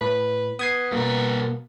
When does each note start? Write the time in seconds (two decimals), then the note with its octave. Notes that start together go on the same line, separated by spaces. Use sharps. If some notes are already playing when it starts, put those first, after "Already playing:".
0.01 A2 B4
0.59 B3 D#6 G#6 C7
0.92 G2 B2 A#3 A#4